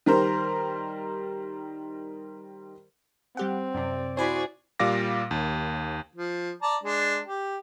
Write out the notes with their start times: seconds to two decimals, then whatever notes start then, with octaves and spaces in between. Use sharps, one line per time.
0.06 D#3 G3 A#4 C5
3.37 G3 C4 G4 F#5
3.74 F#2 C3 D5
4.17 E4 F#4 G#4 C5 D5 G#5 B5
4.79 A#2 G3 F5 D6 A#6
5.31 D#2
6.15 F3
6.62 D5 A5 A#5
6.84 G#3 D4
7.26 G4